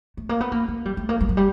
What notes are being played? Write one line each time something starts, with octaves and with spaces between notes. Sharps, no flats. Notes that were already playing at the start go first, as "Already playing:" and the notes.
A3
A#3
B3
A#3
A#3
G3
A3
A#3
G3
F#3
G3